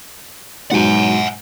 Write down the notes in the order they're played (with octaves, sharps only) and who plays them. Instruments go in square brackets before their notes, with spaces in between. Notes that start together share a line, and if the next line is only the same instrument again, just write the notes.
[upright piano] G#2 B2 F#3 [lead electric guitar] F#5 G#5